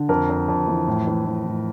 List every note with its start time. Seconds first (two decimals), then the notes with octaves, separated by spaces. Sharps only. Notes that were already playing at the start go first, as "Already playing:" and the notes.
Already playing: D3
0.09 F2 A#4
0.29 F2
0.48 F2
0.68 E3
0.88 A2
1.07 E3
1.27 E3
1.46 A2